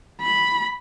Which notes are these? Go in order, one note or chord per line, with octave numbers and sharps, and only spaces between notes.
B5